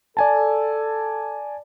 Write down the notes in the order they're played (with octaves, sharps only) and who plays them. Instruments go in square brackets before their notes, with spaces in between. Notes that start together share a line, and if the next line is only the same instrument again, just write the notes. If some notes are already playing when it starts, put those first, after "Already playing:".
[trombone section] A4 [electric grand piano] D5 G#5 A5